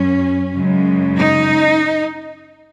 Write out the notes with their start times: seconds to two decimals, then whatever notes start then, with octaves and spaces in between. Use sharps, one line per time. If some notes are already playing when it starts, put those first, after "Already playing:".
Already playing: F#2 F#3 C#4
0.54 F#2 C#3 G#3
1.16 D#4